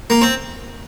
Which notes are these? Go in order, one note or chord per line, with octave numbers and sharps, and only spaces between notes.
A#3
C4